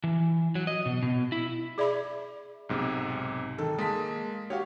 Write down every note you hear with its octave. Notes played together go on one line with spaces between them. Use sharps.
E3
F#3
D#5
B2
B2
E4
G#4 D5 E5 B5
B1 G#2 C3
D#3 A4
G#3 A#3 A5 D#6 B6
F#4 G4 C#5 F5